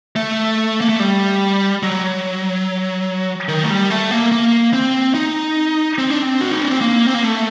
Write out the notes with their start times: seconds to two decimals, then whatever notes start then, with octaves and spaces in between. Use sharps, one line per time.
0.16 A3
0.81 A#3
0.89 A3
1.00 G3
1.83 F#3
3.49 D#3
3.63 A3
3.70 G3
3.90 A3
4.11 A#3
4.32 A#3
4.73 C4
5.15 D#4
5.98 C4
6.10 D4
6.22 C4
6.41 F#4
6.51 D#4
6.62 D4
6.71 C4
6.81 A#3
7.06 C4
7.14 A#3
7.23 A3